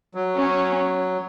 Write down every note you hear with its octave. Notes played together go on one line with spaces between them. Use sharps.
F#3
C#4